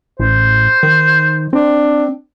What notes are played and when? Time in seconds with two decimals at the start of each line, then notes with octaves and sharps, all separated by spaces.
0.20 A1 C5
0.83 D#3
1.53 C4 D4